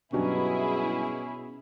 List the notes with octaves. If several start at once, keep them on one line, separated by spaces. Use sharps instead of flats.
G2 B2 F#3 G3 C#4 E4 G#4